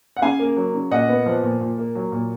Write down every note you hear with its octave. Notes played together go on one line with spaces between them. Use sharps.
F#5
C#3 F5 G#5
A#3
F#3
C#3
A#2 D#5 F#5
B3
F3
A#2
A#2
A#3
F#3
A#2